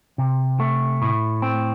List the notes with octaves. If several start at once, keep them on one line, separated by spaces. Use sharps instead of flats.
C3
A3
A2
C4